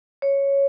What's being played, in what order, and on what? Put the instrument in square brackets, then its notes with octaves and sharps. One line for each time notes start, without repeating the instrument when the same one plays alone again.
[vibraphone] C#5